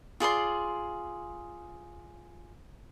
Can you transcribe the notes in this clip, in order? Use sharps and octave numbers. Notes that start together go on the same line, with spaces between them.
F4 G#4 D5 C6